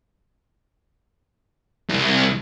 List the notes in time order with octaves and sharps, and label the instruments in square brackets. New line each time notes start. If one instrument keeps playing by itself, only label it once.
[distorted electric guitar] C2